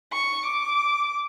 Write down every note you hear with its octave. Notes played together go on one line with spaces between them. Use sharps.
C#6
D6